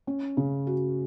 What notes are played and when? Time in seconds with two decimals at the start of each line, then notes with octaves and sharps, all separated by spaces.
0.07 C#4
0.37 C#3
0.67 F#4